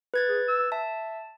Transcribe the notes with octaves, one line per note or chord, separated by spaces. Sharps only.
B4 G#6 A6
G#4
E6
E5 A5